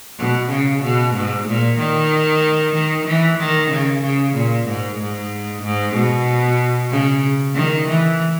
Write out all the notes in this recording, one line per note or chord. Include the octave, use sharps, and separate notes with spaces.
B2
C#3
B2
G#2
A#2
D#3
D#3
E3
D#3
C#3
C#3
A#2
G#2
G#2
G#2
B2
C#3
D#3
E3